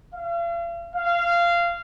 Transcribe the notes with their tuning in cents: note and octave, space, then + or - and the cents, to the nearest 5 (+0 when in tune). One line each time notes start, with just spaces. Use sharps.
F5 -40
F5 -15